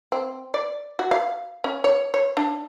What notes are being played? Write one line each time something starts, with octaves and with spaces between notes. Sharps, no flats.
C4
D5
F#4
F5
C#4
C#5
C#5
D4